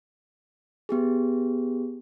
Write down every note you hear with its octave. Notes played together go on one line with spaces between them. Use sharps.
B3 G4 G#4